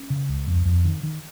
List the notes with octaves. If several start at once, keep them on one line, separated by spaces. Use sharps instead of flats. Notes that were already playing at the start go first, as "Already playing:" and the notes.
Already playing: C#4
C#3
C#2
F2
F2
D#3
D#3